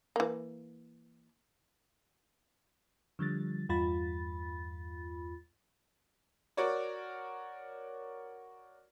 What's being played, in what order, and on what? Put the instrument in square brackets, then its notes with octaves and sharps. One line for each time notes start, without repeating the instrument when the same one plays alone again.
[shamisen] E3 A#3
[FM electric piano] D3 F3 G3 A6
E2 G2 F4 B5 A6
[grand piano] F#4 A#4 C#5 D5